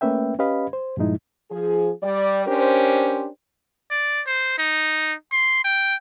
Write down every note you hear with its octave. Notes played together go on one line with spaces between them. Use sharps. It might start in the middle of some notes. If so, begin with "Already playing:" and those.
A3 A#3 C#4 B4 E5 G5
C#4 G4 B4 D#5 F5 B5
C5
G2 A#2 F3 G#3 D#4 E4
F3 G#4
G3 D5
C#4 D4 G4 A#4 C5
D5
C5
D#4
C6
G5